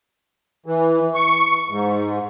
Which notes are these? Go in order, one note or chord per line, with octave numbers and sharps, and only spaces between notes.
E3
C#6
G#2